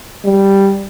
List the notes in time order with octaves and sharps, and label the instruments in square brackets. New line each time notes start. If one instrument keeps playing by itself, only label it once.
[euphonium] G3